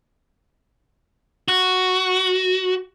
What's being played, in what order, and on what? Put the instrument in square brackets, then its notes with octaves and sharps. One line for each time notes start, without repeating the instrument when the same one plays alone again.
[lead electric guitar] F#4